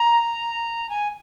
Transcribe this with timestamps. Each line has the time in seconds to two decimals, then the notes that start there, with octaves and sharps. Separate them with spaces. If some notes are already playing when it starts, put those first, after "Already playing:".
Already playing: A#5
0.89 G#5